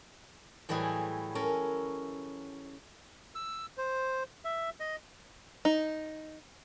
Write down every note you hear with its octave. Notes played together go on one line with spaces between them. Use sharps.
A2 E3 F#3 G3 E4 G#4
C#4 A4 A#4
E6
C5
E5
D#5
D#4